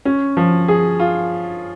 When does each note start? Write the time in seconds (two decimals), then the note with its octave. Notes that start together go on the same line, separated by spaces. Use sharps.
0.05 C#4
0.37 F3
0.68 G#4
1.00 F4